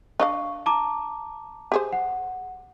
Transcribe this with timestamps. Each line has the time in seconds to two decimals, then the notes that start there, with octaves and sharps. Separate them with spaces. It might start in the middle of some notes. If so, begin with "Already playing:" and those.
0.20 D4 D#5 F5 C#6
0.66 A5 A#5 D6
1.72 G4 G#4 C5
1.93 F#5